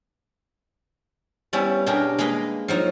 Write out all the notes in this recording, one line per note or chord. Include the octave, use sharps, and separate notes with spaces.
G3 B3 C#4 E4
B2 D4 G4 G#4 A#4
G#3 A#3 B4 D#5
F3 F#3 D#4